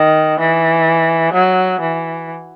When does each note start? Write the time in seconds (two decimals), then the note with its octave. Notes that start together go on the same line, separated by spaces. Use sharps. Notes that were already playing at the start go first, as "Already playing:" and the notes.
Already playing: D#3
0.40 E3
1.33 F#3
1.81 E3